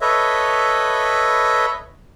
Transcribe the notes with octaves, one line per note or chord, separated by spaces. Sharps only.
A4 B4 C#5 D#5 E5